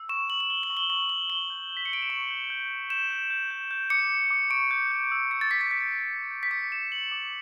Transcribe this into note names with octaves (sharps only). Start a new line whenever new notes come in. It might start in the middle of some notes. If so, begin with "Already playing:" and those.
Already playing: E6
C#6 E7
C#6 F#7
F#7
C#6 G7
F#7
C#6
G7
C#6 F#7
C#6 F#7
C#6 G7
G6
G6
B6
C#7
G6 D7
E7
C#6 F#7
G6
G6
G6
G6 E7
G6
G6
G6
G6
D6 C#7
G6
D6
C#6 D7
G6
G6
E6
E6 C#7
A6
C#6 B6
A6
G6 B6
E6
G6
G6
B6
D6 C#7
D6 E7
G6 F#7
D6